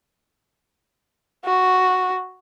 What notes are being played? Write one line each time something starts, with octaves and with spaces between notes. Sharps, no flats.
F#4